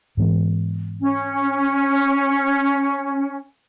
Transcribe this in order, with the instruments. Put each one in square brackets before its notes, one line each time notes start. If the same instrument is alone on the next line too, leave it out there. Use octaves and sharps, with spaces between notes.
[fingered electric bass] G#2 E3 G#3 B3
[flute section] C#4